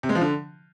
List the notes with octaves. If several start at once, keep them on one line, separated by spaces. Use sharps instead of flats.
C3
G#3
F3
D3